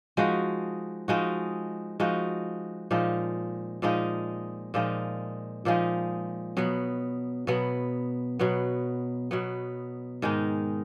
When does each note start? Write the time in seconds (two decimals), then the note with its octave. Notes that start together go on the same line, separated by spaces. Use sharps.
0.17 F3 G#3 D#4 F#4
1.08 F3 G#3 D#4 F#4
2.00 F3 G#3 D#4 F#4
2.91 A#2 F3 G#3 D#4
3.82 A#2 F3 G#3 D#4
4.74 A#2 F3 G#3 D#4
5.65 A#2 F3 G#3 D#4
6.57 B2 F#3 B3
7.47 B2 F#3 B3
8.39 B2 F#3 B3
9.31 B2 F#3 B3
10.22 G#2 D#3 G#3 D#4